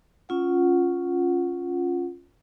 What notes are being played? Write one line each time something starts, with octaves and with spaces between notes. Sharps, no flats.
C#4 F4 F#5